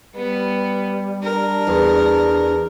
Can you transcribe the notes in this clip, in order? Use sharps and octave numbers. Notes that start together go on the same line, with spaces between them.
G3 B3
D4 A#4
E2